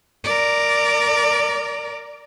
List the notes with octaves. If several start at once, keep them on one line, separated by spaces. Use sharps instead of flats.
A#4 D5